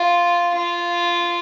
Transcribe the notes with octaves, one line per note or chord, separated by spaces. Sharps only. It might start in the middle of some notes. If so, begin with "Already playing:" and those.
Already playing: F4
F4